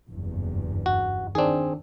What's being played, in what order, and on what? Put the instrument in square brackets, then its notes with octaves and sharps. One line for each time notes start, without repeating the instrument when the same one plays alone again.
[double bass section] F#1 E2 G2
[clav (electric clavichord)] F#4
[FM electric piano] D#3 D4 [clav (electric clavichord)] C4 G#4